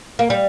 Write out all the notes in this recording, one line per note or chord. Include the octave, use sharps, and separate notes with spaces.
A#3
G3